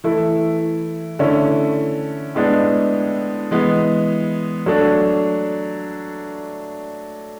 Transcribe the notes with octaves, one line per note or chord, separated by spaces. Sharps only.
E3 A3 E4
D3 A3 C#4 E4
A2 G#3 B3 D4
E3 G#3 B3
F#3 A3 D4